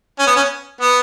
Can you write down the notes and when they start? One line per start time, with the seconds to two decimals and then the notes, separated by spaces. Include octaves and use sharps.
0.19 C#4
0.27 B3
0.36 C#4
0.81 B3